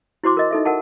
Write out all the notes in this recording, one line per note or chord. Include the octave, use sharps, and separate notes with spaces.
E4 F#4 C5 C6 D6
A#4 D#5
D#4 A4 E5
A#4 F#5 A5